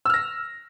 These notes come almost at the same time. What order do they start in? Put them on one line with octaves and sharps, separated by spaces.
E6 F6 A#6